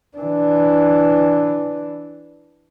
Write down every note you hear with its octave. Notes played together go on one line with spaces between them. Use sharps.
E3 D4